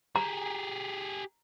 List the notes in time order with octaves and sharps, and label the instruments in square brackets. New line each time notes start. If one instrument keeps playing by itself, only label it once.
[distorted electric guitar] G4 G#4 [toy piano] A#5